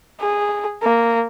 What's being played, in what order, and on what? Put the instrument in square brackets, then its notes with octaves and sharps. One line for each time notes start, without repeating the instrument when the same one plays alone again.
[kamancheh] G#4
A#3